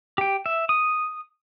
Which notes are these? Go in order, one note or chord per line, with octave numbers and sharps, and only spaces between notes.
G4 G5
E5
D#6